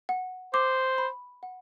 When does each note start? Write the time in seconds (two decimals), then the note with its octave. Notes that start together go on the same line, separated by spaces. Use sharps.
0.09 F#5
0.54 C5 D6
0.98 B5
1.43 F#5